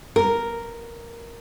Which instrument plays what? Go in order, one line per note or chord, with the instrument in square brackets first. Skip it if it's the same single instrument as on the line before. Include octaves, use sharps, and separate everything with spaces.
[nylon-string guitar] A#4